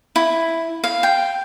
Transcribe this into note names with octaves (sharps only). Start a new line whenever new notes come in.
E4
F5
G5